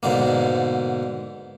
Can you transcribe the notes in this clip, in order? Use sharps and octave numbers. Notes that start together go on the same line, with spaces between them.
G#2 B2 D3 A#3